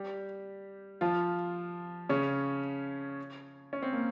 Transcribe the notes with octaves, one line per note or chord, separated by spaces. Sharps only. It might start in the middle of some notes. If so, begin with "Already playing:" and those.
Already playing: G3 G4
F3 F4
C#3 C#4
C#4
C4
A#3